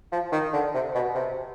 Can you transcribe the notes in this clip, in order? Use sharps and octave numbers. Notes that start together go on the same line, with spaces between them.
F3
D#3
D3
C3
B2
C3